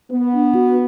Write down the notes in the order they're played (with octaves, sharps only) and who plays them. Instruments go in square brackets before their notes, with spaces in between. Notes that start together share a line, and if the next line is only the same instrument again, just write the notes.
[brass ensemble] B3
[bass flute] D4
F#4